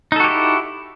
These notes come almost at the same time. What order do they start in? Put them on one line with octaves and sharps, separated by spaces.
D#4 A4 F#4 G4 E4